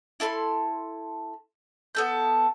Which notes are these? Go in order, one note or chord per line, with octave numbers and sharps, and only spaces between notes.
E4 A4 B5 C6
B3 A4 G6